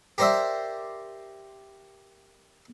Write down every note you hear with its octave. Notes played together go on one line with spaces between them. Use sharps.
G4 A#4 C5 D5 E5